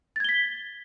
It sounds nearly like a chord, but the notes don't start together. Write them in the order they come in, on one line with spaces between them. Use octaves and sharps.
A6 G#6 G7 B6